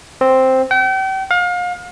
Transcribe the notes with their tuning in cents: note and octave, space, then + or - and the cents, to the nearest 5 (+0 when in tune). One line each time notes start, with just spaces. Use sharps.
C4 +0
G5 -40
F5 +35